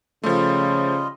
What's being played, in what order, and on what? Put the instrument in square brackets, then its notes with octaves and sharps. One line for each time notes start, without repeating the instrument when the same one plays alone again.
[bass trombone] C#3 [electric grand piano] F3 A3 [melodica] G3 F4 D#5